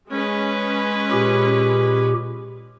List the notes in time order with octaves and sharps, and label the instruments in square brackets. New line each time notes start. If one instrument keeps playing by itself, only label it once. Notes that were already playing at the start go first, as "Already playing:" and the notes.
[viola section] G#3 C#4 B4
[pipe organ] A#2 G4